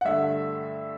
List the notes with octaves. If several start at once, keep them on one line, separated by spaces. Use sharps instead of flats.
F#5
G2 D3 A3 E5